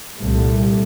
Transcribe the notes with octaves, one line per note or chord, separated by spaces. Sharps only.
C2 A#2 G3 A3